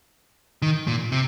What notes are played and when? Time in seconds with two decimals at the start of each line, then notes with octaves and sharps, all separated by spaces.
0.62 D#3
0.87 A#2
1.12 C3